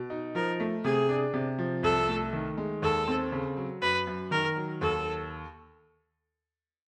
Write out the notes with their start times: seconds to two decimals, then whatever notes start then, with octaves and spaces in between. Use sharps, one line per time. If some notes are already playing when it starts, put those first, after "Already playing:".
Already playing: B2
0.10 D#4
0.35 F3 A#4
0.60 A3
0.84 C3 G#4
1.09 D4
1.34 C3
1.59 F3
1.83 C2 A4
2.08 A3
2.33 D#3
2.57 G#3
2.82 D#2 A4
3.08 C4
3.32 C#3
3.57 F#3
3.82 F#2 B4
4.07 F#2
4.31 D#3 A#4
4.56 F#3
4.81 D#2 A4